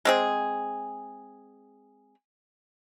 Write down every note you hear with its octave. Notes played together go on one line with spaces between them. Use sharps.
G#3 C4 G#4